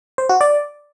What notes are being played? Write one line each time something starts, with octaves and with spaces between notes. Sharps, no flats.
C5
F#4
D5